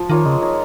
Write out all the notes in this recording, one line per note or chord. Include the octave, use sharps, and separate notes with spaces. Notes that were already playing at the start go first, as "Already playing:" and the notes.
Already playing: F3
D#3 A#3 F4 C#5
C#3 G#3
D#4 C#5